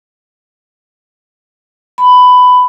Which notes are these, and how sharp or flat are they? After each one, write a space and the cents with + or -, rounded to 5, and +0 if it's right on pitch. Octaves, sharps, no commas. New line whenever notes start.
B5 +15